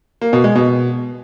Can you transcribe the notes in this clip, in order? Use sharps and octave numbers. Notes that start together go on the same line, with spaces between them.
A#3
B2
G#3
B2